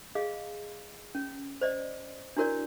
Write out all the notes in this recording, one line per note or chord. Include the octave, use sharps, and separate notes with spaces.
G#4 D#5 F5
C#4
C5 D5 D#5
D4 E4 F#4 A#4 C#5 D5